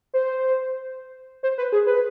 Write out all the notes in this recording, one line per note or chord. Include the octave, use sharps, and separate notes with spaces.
C5
C5
B4
G#4
B4